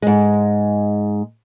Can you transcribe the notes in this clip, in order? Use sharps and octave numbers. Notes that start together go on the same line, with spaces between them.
G#2 G#3